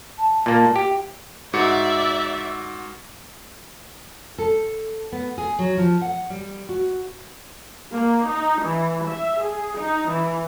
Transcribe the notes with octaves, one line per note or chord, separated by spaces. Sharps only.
A5
A#2 A#3
G4
G#2 F#4 D5 E5 C#7
A4
B3
G#4
F#3
F3
F#5
G3
F#4
A#3
D#4
E3
E5
G#4
D#4
E3